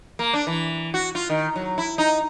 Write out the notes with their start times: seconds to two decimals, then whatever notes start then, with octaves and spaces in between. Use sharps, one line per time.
0.19 A#3
0.33 D4
0.47 E3
0.94 F#4
1.15 F4
1.30 D#3
1.56 F#3
1.78 E4
1.98 D#4